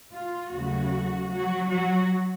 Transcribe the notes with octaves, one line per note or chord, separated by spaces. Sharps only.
F4
D#2 C#3 F#3 A3 F#4
F#3 F#4
F#3 F#4